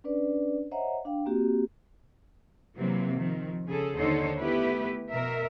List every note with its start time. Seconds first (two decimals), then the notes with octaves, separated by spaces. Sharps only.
0.04 C#4 D4 B4 D5
0.71 C5 C#5 D#5 E5 F#5 A#5
1.05 D4 F5 G5
1.26 A#3 C4 F#4 G4
2.77 C3 E3 F#3 A#3 C4
3.17 D#3 F3 C4
3.67 C#3 G#4 A4
3.97 D#2 D3 D#4 A4 C5 C#5
4.39 A3 B3 E4 G4 B4
5.11 B2 A#4 E5